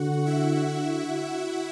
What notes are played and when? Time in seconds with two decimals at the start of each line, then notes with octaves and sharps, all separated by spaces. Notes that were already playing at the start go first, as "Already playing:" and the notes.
Already playing: D3 F#4 F#5
0.26 E4 E5